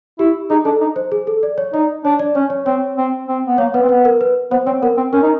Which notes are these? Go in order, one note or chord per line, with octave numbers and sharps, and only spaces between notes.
E4 G4
D#4 G#4
D4 A4
D#4
C5
G#4
A4
D5
C#5
D#4 D5
D4 C#5
D5
C#4 C#5
C#5
C4 C#5
C4
C4
B3
A#3 C#5
B3 B4
C4
B3 B4
A#4
B4
B3 C5
C4 C#5
B3 A#4
C4
C#4 A#4
D#4